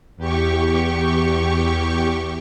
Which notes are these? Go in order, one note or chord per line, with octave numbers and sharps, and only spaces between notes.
E2 G4 C#6